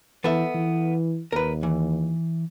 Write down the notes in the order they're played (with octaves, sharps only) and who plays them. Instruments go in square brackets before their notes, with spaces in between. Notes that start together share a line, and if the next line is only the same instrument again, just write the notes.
[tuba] E3 [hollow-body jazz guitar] B3 A4 E5
[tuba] E3
[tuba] D#2 [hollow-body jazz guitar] A#4 B4
[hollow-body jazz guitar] E3